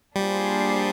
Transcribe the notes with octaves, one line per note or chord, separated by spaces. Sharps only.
G3 A#3 D4 F4 G#4 C5